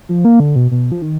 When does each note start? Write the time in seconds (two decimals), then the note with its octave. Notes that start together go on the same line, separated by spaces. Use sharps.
0.09 F3
0.25 A#3
0.40 D3
0.56 B2
0.71 B2
0.92 F3
1.02 D#3